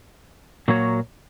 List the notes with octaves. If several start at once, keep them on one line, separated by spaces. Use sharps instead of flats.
A#2 F#3 A#3 F#4 C#5